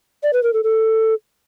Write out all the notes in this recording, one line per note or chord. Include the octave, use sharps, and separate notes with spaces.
D5
B4
A#4
A4
A4